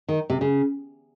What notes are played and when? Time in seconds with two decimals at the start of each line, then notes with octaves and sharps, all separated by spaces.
0.08 D#3
0.30 C3
0.41 C#3